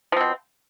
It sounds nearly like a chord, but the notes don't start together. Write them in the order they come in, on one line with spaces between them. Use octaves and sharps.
F3 C4 B2